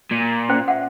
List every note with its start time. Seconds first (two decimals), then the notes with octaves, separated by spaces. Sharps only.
0.11 A#2
0.49 C#4 C5 G5
0.68 E5 F#5